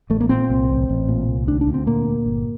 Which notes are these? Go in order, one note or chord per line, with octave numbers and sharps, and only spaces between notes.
A1 A3
A#3
A#2 C4
C2
A1
A1
A#2
C2
D2 D4
D4
D2
C4
A#2 A#3
A#2
G1